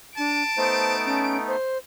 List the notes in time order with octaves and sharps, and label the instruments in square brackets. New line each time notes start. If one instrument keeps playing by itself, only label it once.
[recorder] D4 [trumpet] A5 [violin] D7
[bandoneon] A3 B3 D#4 [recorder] C5
[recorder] C#4
C5